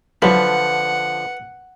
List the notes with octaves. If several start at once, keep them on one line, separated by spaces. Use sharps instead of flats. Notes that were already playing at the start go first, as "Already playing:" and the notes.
D3 F3 F#3 E4 B4 F#5